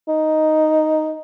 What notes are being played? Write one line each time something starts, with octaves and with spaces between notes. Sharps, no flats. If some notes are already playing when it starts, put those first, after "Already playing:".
D#4